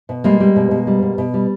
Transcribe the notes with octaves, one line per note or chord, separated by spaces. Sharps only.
B2
G3 G#3 A#3
G3
B2
B2
G3
B2
B2
G3